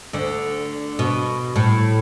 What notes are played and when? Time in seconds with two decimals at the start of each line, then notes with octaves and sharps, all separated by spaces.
0.13 D2 D3
0.99 B2
1.56 A2